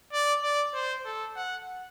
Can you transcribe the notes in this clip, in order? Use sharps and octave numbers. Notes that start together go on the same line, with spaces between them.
D5
D5
C5
A4
F#5